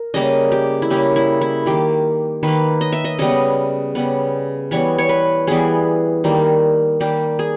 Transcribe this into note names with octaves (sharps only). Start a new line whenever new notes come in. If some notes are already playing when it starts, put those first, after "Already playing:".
Already playing: A#4
C#3 G3 A#3 D#5
G4
E4
C#3 G3 A#3 G4
E4
E4
D#3 A#3 G4
D#3 A#3 B4
D#5
E5
D#5
C#3 G3 B3 D#5
C#3 G3 B3
E3 G3 B3 C#5
C#5
B4
E3 G3 B3 G#4
D#3 G3 A#3
D#3 G3 A#3 G4
G#4